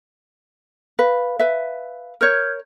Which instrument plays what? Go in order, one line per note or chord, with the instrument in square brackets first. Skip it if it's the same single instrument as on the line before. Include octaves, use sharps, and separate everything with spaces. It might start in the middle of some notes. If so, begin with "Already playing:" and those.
[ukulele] B4 [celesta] F5
[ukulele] B4 E5
[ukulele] A#4 C#5 [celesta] F6 G6 G#6